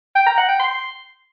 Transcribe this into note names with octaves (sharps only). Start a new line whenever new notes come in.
G5
A#5
F#5
G5
C6